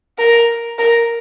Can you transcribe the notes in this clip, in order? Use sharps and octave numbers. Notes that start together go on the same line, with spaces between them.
A#4
A#4